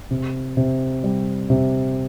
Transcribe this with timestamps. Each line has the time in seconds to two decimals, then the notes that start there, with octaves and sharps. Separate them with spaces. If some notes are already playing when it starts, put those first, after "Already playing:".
0.11 C3
0.57 C3
1.03 G3
1.50 C3